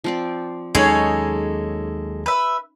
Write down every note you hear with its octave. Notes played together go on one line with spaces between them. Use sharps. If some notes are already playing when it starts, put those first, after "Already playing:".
F3 C4 D5
D#2 F#3 G#3 C#4 D#4 G#4 A4 C#5
B4 E5